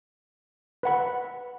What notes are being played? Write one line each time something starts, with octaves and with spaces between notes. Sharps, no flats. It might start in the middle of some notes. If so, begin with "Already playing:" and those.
B4 F#5 B5